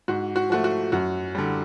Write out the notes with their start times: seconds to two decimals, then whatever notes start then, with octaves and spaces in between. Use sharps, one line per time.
0.08 G#2 F#4
0.36 F#4
0.50 F3 A3 F#4
0.64 F#4
0.92 F#2 F#4
1.35 D3 G3